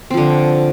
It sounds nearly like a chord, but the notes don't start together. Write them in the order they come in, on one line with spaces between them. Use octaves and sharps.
C4 F3 D3